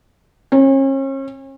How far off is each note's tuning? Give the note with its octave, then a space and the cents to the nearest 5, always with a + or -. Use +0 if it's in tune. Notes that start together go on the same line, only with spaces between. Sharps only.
C#4 -40